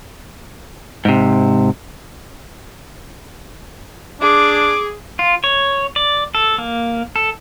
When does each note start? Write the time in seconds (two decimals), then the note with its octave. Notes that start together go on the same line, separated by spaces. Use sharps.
1.05 G#2 C3
4.21 D4 G#4 D6
5.19 F4
5.44 C#5
5.96 D5
6.35 A4
6.58 A#3
7.16 A4